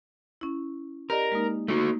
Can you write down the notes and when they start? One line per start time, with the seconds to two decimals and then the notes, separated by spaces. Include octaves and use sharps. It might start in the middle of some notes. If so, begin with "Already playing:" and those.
0.41 C#4 E4
1.10 G4 A#4 D5 D#5
1.32 G#3 A#3 D#4
1.68 A3 A#3 D#4 F#4